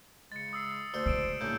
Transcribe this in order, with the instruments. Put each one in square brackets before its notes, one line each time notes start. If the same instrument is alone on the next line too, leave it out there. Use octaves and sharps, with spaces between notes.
[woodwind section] C#3 G#3 [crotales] A6 C#7
[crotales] D#6 E6 C7
[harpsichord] D2 A4 [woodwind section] C5 [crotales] G7
[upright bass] C#3 G#3 [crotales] E6 D7 E7
[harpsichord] A#1 A2 [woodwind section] G3 C#4 D4 [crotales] G6